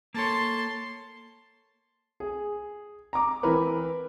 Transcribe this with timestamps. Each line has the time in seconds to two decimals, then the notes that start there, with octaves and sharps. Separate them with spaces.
0.14 A#3 A4 C#5 A5 C6
2.20 G#4
3.13 A#5 D6
3.43 E3 C4 E4 A#4 B4